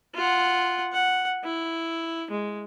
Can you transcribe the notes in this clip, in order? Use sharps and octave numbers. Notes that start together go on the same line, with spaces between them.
F4 F#5
F#5
E4
G#3